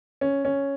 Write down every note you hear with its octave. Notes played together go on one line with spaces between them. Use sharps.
C#4
C#4